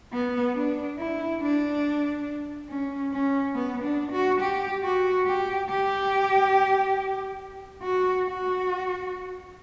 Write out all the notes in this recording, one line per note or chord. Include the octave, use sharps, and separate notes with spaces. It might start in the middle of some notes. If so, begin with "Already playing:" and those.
B3
D4
E4
D4
C#4
C#4
B3
D4
F#4
G4
F#4
G4
G4
F#4
F#4